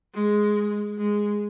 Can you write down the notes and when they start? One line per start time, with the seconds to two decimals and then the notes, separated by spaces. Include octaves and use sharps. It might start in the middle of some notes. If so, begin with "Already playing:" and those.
0.14 G#3
0.98 G#3